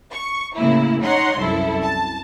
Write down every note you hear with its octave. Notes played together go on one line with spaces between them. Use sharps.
C#6
A2 C#3 A#3 E4
D#4 C#5 F#5 A#5 C6
C2 F#2 E4 A4
A5